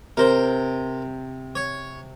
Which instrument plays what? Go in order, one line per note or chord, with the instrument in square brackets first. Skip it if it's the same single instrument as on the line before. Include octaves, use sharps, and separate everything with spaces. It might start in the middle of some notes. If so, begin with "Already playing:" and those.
[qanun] C3 [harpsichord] A#4 C5
[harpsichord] C#5